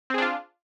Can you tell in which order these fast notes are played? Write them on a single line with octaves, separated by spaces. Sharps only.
C4 G#4 D4 F4